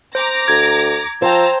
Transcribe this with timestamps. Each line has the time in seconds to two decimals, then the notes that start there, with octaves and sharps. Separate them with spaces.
0.15 C5 A#5 D6 A#6
0.48 D2 G#6
1.22 F3 C5 G5 A5 A#5 E6